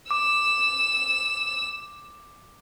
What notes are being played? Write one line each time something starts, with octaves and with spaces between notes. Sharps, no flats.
D6 E6